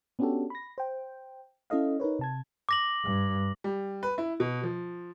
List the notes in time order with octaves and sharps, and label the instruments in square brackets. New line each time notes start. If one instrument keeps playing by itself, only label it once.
[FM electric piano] B3 C#4 D4 F#4 G4 A4
B5 A#6
C5 G5
C#4 E4 A4 D#5 F5
D#4 A#4 B4 C#5
C3 A5 G#6
[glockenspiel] D6 A#6 F#7
[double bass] G2
[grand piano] G3
B4
E4
B2
F3